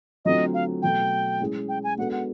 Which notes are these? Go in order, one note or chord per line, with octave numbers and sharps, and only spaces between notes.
D3 F#3 A3 C4 F4 D#5
F5
B2 F#3 A3 G5
G#3 C#4 E4 G#4
G5
G#5
G#3 B3 D4 F#4 A4 F#5
F#5